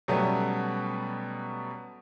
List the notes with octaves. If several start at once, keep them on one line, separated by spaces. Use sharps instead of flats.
B2 F#3 G3 A3 B3 C#4